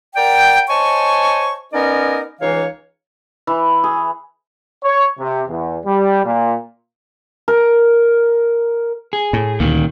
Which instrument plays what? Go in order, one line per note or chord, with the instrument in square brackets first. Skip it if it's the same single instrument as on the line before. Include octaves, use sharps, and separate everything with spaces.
[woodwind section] A#4 D5 F#5 G5
C5 C#5 D#5 G#5 A5 C#6
B3 C#4 D#4 A#4 D5 D#5
C#2 E3 D#4 C#5 F5
[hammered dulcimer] E3
G#4
[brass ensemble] C#5
C3
E2
G3
A#2
[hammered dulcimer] A#4
[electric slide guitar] G#4
[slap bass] A2
[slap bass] D2 [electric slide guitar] A#2 D#3